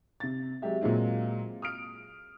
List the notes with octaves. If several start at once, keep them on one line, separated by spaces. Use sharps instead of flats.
C3 A6
F#3 G#3 G4 E5
A#2 F#3 G#3 C4
D#6 F6 D7